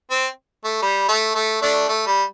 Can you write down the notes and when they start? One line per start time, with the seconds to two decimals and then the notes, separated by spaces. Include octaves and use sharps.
0.11 C4
0.65 A3
0.82 G3
1.09 A3
1.35 A3
1.62 A3 D4
1.89 A3
2.07 G3